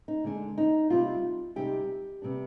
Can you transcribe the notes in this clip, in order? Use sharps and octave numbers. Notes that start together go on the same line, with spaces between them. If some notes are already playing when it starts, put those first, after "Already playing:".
D#4
D3 G#3 D4
D#4
C3 G3 C4 D#4 F4
C3 G3 C4 D#4 G4
C3 G3 B3 D4